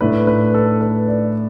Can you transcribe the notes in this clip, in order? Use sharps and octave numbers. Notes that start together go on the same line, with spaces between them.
A2 A3 D4 B4
B4
A4
B4
D5